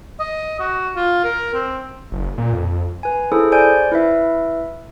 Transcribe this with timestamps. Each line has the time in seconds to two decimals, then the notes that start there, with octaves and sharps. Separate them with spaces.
0.19 D#5
0.59 F#4
0.96 F4
1.24 A#4
1.54 C4
2.12 F#1
2.38 A#2
2.53 F2
3.03 B4 G#5
3.32 E4 G#4 A4 C5
3.52 C5 D5 G#5 G6 D7
3.92 E4 B4 E5